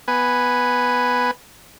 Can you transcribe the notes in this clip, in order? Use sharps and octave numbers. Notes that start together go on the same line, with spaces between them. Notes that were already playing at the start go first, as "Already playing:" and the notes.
B3 B4 G#5